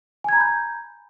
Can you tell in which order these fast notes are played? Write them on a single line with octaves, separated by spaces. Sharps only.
G#5 G#6 A#5 B5 G6